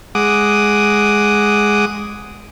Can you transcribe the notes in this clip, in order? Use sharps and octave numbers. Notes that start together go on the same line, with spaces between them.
G#3 F#5 D6 D#6